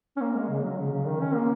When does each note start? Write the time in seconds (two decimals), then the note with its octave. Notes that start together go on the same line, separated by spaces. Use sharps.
0.17 C#4
0.21 A#3
0.35 G#3
0.49 C#3
0.64 F#3
0.78 C#3
0.93 C#3
1.07 D#3
1.20 C#4
1.35 A#3